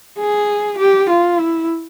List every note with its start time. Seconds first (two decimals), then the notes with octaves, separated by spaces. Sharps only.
0.18 G#4
0.78 G4
1.09 F4
1.40 E4